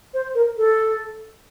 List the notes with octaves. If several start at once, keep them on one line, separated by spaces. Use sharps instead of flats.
C5
A#4
A4